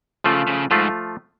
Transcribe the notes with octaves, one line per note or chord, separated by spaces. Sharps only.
C#3 F3 A3 F4
C#3
G#2 F3 A3 F4